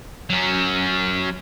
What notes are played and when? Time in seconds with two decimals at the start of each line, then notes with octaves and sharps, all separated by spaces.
0.30 F#3 C#4